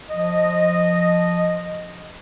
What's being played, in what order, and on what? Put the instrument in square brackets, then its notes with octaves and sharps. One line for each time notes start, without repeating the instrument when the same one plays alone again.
[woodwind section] F3 D#5